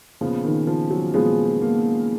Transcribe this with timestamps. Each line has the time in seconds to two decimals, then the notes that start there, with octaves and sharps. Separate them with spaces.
0.21 A#2 C#3 F3 B3
0.44 D#3
0.67 F3
0.91 F#3
1.14 A#2 F3 G#3 B3
1.61 A#3